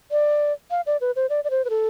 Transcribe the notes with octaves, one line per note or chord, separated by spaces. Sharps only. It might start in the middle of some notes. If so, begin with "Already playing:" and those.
D5
F5
D5
B4
C5
D5
D5
C5
B4
A4